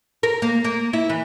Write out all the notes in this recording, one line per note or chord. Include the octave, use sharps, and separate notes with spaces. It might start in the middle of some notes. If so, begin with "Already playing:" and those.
A#4
A#3
A#3
E4
E3